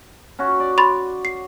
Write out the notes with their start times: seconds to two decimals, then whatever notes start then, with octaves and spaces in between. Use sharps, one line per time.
0.39 C#4 F#4
0.60 D5
0.78 B5 C6 A6
1.25 C7